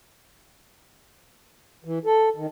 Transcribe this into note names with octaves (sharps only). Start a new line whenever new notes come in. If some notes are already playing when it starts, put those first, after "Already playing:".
E3
A4
D#3